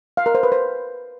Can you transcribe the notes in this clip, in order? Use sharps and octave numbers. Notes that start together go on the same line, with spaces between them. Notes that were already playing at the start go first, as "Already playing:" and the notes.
F5
A#4
C5
B4
C5